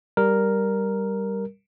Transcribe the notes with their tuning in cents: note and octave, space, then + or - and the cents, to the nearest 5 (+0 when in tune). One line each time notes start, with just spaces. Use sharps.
G3 +0 A#4 +0